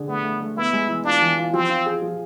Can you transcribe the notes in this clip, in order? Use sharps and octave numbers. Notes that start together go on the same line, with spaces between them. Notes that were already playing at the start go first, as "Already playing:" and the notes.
Already playing: D3 D4 G#4
A3 B3
A3
A3
B3 E4
G#3
E3
D4 F4
E3
F4
F3 C4
F4
G#4
F3